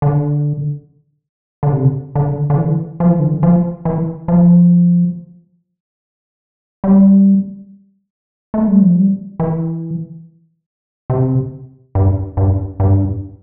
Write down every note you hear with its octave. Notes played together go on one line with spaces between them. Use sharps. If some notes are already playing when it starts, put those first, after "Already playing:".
D3
D3
C3
D3
D3
E3
F3
E3
D3
E3
F3
E3
F3
G3
A3
G3
F3
G3
E3
C3
G2
G2
G2